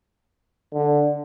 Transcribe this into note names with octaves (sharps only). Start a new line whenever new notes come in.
D3